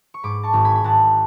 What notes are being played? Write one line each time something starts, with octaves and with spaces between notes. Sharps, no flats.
C#6
G#2 B5 D6
A5 C#6
G#1
G#5 B5
B5
G#1 F#5 A5